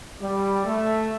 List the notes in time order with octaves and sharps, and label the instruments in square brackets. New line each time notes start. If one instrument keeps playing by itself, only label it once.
[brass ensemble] G3 [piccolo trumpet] D5
[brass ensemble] A3 [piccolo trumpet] E5